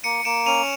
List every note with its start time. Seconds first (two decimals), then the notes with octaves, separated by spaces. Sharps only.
0.04 A#3 C#7 D#7
0.25 A#3 D7 E7
0.46 C#4 D#7 F7